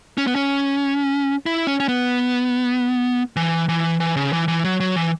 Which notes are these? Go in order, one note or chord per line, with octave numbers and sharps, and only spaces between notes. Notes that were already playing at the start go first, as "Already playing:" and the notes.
C#4
B3
C#4
E4
C#4
C#4
B3
E3
E3
E3
C#3
E3
E3
F#3
F#3
E3